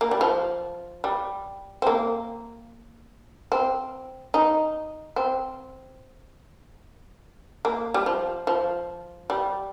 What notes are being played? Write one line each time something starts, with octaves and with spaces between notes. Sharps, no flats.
A#3
G3
F3
G3
C4
A#3
C4
D#4
C4
A#3
G3
F3
F3
G3